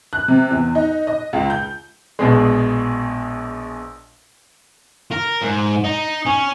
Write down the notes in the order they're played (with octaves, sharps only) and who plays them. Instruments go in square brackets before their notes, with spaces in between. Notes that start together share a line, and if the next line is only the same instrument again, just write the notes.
[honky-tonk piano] F#6
C3
E2
D#4
D#5
C#2
G6
[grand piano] A#1 B2 G#3
[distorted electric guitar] A#4
G#2
D#4
C#4